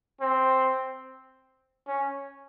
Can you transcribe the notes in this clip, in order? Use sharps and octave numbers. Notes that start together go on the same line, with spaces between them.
C4
C#4